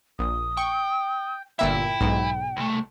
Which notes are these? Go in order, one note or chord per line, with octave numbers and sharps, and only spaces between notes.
A#1 D#6
G5 C#6
G1 A#2 E4 E5 G5
B1 G#2
C2 A3